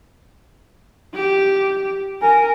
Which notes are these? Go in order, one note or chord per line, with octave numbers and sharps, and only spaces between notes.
G4
A#4 G#5